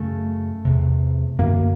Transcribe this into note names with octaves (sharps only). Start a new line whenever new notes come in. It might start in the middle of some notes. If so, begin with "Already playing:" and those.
Already playing: F#2 C#3 A3
E2 C3
F#2 D3 A#3